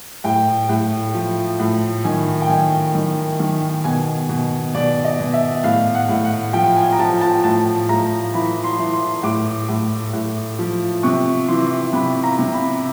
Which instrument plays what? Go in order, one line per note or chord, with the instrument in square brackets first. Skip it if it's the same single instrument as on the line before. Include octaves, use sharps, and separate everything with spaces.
[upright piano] A2 G5
A2
F3
A2
D#3 G#5
G5
D#3 G#5
D#3
D#3
B2 G#5
B2
B2 D5
D#5
B2
E5
A2 F5
F#5
A2
F#5
F3 G5
G#5
A#5
F3 A5
A5
A2 A5
A2 A#5
E3 B5
C6
E3
C6
A2 D6
A2
A2
F3
C3 C#6
E3 C6
C3 B5
A#5
C3
B5